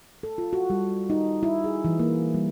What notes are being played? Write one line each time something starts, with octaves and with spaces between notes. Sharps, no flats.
A4
F4
F#4
G3
D#4
E4
G#4
E3
A#3
G3